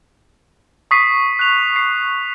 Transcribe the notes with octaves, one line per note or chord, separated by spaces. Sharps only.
C#6 D#6 B6 C7 D#7
F#6 F7
C7